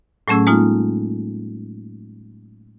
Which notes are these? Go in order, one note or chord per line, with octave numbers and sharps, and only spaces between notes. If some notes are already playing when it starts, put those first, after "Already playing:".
A2 F#3 A3 C#4 G#4 E6
G#3 A#3 D#4 F4